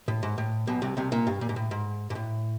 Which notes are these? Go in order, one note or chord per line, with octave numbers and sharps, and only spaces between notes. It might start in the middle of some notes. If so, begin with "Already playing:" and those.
A2
G#2
A2
B1 B2
C2 C3
C2 C3
A#2
G2
A#2
G#2
A2
G#2
G#2
A2